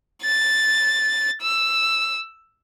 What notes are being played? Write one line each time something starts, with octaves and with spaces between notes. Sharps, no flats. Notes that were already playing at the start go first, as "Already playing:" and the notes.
A6
E6